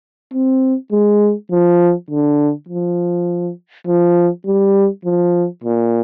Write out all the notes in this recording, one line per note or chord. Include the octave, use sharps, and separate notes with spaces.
C4
G#3
F3
D3
F3
F3
G3
F3
A#2